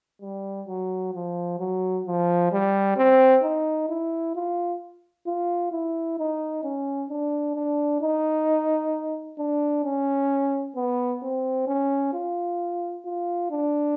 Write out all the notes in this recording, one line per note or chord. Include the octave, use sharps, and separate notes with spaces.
G3
F#3
F3
F#3
F3
G3
C4
D#4
E4
F4
F4
E4
D#4
C#4
D4
D4
D#4
D4
C#4
B3
C4
C#4
F4
F4
D4